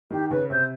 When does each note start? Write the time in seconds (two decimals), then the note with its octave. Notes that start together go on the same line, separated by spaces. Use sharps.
0.11 D#3 G4
0.30 C#3 B4
0.50 C3 C5